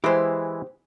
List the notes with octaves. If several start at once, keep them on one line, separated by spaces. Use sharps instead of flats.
E3 G#3 E4 G4 C5